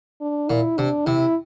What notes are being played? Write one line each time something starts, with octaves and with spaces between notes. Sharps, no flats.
D4
A#2 E4
C3 D4
C3 E4